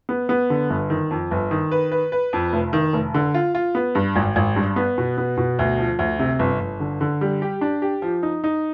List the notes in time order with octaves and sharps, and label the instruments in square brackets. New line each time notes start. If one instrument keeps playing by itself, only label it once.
[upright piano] B3
B3
D3
G1
D#3
F2
G1
D#3
B4
B4
B4
F2
F1
D#3
F1
D3
F4
F4
B3
G2
G#1
G#1
G2
B3
B2
B3
B2
D2
F3
D2
C3
G1
G1
D3
D3
G3
G4
D4
G4
F3
D#4
D#4